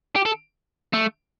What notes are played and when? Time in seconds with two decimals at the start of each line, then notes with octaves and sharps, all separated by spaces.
0.16 G4
0.25 A4
0.93 A3